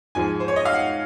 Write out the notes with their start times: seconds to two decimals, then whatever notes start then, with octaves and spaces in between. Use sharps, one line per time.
0.15 G#2 F3 G#3 G#5
0.40 C5
0.48 C#5
0.56 D#5
0.65 F5
0.73 F#5